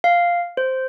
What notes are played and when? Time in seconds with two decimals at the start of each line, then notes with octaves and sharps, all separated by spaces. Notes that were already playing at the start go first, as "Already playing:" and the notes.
0.04 F5
0.57 C5